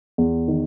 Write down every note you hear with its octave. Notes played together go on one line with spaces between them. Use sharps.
E2
D#3